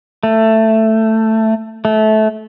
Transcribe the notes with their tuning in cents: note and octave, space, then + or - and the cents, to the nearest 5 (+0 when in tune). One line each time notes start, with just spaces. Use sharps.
A3 +10
A3 -20